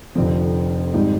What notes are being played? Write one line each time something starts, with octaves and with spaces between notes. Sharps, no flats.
F1 F2 D3 F3 C4
G#1 G#2 G3 D#4